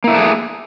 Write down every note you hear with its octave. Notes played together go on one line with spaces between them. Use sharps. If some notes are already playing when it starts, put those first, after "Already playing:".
A3 A#3 D4 E4 G#4